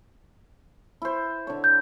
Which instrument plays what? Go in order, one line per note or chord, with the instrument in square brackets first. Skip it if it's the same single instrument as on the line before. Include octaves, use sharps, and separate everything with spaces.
[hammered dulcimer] E4 C5
D3 C#5
[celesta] G6